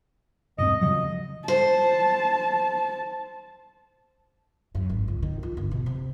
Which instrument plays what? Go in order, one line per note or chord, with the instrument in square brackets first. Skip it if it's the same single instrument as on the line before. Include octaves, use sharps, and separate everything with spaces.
[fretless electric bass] E1 G2 C4 [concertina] D#5
[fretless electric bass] C#3 F3 F#3 [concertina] D#5
[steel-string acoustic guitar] C5 [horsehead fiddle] A5
[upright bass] F#2
G#1
C#2
D#3
F4
G1
B2
C3